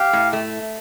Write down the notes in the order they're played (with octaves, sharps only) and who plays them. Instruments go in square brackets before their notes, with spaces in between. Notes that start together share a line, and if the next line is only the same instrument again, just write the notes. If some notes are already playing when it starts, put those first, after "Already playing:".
Already playing: [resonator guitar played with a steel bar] G4 [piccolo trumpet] F5
[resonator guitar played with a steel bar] A2
A3